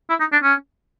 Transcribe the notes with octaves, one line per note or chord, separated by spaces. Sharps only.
E4
D#4
D4
C#4